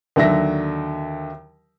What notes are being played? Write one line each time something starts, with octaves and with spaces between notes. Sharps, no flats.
D#2 D3 F#3 E5 A#6